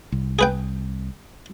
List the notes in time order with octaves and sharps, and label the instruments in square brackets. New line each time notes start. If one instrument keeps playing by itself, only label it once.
[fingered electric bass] C2
[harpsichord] G#4 B4 G5